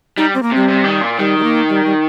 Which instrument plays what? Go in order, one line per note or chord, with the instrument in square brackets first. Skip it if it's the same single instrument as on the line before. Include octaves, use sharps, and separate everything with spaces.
[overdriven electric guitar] G3 [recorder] D#4
[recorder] C4
A#3
[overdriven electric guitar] C3 [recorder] G3
[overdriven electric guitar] C3
D#3
A#2
[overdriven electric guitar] D#3 [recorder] G3
[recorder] G3
A#3
G3
G3